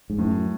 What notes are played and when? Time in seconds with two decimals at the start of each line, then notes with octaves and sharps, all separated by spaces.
0.10 G#2
0.18 F#2 A2